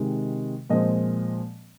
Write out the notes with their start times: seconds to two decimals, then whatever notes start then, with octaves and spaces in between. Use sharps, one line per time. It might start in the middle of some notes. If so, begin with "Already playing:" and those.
Already playing: C3 D#3 G#3
0.70 A#2 F3 G#3 C4 D#5